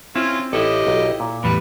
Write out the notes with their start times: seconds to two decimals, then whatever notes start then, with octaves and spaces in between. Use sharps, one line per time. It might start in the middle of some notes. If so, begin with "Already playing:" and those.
0.16 C4 C#4 E4 F4
0.53 A1 E4 G4 A4 D#5
0.87 B1
1.20 A#2
1.44 E2 A2 G3 B4 B5